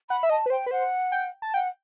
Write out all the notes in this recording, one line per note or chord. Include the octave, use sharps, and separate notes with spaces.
F#5 B5
E5
D#5 A5
B4
C5 G5
B4
C5 F#5
G5
A5
F#5 G5